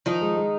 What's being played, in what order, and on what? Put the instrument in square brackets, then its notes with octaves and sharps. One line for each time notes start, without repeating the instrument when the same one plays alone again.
[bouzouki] D#3 D#4 [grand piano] F3
[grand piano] G#3
G#3